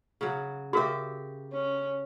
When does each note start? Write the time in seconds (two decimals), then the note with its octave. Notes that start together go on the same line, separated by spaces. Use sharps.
0.21 C#3 F#3
0.73 C#3 F#4 G4 A#4 E5
1.53 C#4